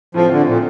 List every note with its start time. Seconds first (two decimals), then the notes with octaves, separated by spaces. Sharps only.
0.14 A2 F3 A3 C4 F4
0.31 D3
0.46 A#2